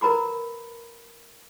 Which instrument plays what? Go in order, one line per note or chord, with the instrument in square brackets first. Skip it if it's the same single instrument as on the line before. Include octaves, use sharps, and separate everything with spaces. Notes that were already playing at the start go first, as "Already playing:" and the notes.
[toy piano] A#4 B4 A#5 B5 D6